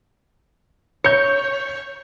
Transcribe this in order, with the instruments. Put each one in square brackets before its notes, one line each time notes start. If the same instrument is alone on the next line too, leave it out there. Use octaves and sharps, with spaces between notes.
[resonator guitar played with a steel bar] C#5 [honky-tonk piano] G6 C#7